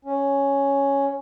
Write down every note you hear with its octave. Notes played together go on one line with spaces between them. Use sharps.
C#4